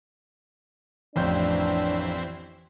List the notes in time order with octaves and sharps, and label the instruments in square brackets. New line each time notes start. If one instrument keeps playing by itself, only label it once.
[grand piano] A1 F2 G6 [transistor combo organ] E3 C4 [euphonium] D4